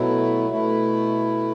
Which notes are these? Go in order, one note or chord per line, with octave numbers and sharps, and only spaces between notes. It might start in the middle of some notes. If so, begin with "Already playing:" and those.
Already playing: B2 F#3 A3 E4
B2 A3 E4